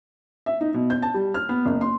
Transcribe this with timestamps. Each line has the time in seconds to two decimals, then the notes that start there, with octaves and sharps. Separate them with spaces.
0.46 E5
0.61 D#4
0.74 B2
0.90 G6
1.02 A5
1.14 G3
1.34 F6
1.49 B3
1.66 F#1
1.81 C6